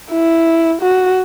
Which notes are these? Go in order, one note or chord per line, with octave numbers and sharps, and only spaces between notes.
E4
F#4